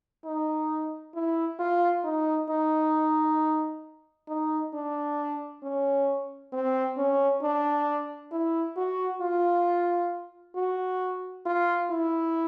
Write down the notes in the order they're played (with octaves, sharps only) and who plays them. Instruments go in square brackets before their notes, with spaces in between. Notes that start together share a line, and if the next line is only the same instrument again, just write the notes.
[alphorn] D#4
E4
F4
D#4
D#4
D#4
D4
C#4
C4
C#4
D4
E4
F#4
F4
F#4
F4
E4